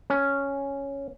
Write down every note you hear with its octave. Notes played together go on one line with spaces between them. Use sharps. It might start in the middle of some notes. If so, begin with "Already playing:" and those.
C#4